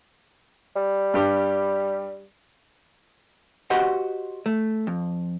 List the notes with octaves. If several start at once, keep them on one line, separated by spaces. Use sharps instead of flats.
G3
G2 G4
F#4 G4 C5 D#5 F#5
A3
F2